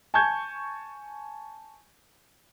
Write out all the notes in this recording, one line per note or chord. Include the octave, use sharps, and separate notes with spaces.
G#5 A5 C#6 G6 G#6